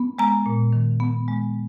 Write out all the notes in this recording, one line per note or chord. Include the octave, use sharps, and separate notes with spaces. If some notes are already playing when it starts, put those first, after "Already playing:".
Already playing: B3
G#3 A#5
A#2
D#3
B3
G#3